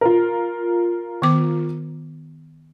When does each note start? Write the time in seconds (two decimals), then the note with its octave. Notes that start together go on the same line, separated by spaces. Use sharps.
0.01 F4 A#4
1.22 D#3 B3 D6